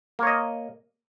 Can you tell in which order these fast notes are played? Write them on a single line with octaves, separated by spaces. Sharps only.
A#3 C#5 D#5